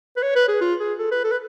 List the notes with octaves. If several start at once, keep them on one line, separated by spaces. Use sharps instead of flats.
B4
C#5
B4
G#4
F4
G#4
A4
B4
A4
B4